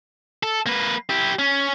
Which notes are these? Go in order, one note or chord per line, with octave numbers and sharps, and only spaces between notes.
A4
A#3 B4
E4 G4
C#4